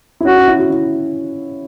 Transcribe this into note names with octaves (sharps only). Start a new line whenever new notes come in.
E4
C#4 F#4
C#4
E4
F#4
E4